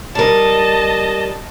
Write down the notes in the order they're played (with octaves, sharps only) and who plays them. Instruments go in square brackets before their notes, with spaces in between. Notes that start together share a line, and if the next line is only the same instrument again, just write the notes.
[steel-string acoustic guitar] G3 A#4 [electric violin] D#5 A5